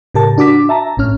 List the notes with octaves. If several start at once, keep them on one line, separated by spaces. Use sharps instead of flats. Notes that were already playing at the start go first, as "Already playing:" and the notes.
A2 C#3 G4 A#4 A5
D4 F#4 D6 B6
E5 A5 A#5
G#1 A2 C#4 F6